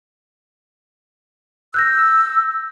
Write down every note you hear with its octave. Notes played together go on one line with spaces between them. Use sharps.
E6 F#6 G6 A#6